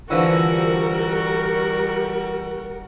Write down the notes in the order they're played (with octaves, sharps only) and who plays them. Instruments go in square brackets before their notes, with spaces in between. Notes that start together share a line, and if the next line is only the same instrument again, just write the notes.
[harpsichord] D3 E3 F3 [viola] G3 A#4 [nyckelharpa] F#4